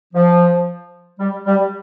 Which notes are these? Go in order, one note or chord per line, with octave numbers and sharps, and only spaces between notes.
F3
G3
G3